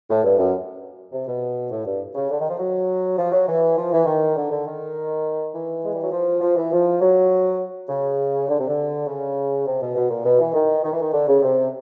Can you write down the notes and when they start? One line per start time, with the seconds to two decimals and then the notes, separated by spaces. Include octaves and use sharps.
0.09 A2
0.24 G2
0.38 F#2
1.12 C3
1.27 B2
1.70 A2
1.85 G2
2.15 C#3
2.30 D3
2.40 D#3
2.49 F3
2.59 F#3
3.18 F3
3.32 F#3
3.48 E3
3.77 F3
3.92 E3
4.06 D#3
4.36 D3
4.50 D3
4.66 D#3
5.53 E3
5.85 G#3
5.94 G3
6.03 F#3
6.12 F3
6.41 F3
6.56 E3
6.72 F3
7.01 F#3
7.89 C#3
8.49 D3
8.59 C3
8.68 D3
9.07 C#3
9.66 C3
9.81 B2
9.96 B2
10.10 A#2
10.25 B2
10.39 E3
10.54 D#3
10.84 D#3
10.92 E3
11.01 D#3
11.13 D3
11.28 C#3
11.42 C3